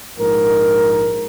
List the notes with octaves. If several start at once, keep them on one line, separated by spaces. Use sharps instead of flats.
A#1 G#2 A#4